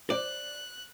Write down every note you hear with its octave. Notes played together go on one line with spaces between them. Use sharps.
C5 D5 F#6